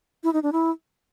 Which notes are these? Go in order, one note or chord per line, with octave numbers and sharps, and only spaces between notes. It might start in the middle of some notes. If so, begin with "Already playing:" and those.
E4
D#4
D4
E4